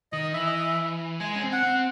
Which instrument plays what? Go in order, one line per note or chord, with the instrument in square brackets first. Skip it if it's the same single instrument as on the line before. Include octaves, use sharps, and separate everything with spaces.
[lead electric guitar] D#3 [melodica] D#5
[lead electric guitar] E3 [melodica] E5
[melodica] D#5
E5
[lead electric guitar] G#3 [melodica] G#5
[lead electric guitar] C#4
C4
[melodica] F#5
[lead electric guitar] C4